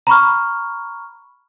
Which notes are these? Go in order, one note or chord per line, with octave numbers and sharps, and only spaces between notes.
A#5 B5 C#6 F6